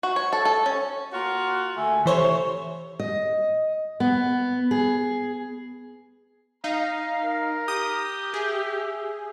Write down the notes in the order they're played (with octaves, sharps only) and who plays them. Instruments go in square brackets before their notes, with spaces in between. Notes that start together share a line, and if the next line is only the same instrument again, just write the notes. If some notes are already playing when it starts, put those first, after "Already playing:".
[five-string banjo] F#4
C#5
A4
A4
C#4
[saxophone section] A#3 F4 F#4
[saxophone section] D3 A3 [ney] G#5
[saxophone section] C3 A3 [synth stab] E3 C5 C#5 [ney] C#6
[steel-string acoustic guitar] D#5
B3
G#4
[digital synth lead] D#4 [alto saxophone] F5 [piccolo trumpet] A#5
[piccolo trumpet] A#4
[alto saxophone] G4 [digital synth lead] D#6
[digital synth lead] G#4 [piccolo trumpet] E5